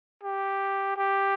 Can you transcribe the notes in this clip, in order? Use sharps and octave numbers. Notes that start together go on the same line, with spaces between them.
G4
G4